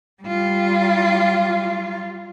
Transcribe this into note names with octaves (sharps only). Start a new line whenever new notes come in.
G3 F4